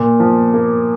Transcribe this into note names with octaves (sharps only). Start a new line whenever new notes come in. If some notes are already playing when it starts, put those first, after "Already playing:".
Already playing: A#2
F3
A#3